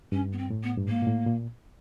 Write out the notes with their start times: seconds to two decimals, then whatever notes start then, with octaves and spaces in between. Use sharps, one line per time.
0.12 G2 C#4
0.32 B3
0.37 C4
0.50 A2
0.63 B3
0.77 G2
0.88 G#2 A#3
1.02 A#2
1.07 A2
1.26 A#2